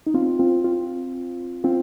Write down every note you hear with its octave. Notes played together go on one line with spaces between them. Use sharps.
D#4
C4 F4
C4 F4
C4 F4
C4 F4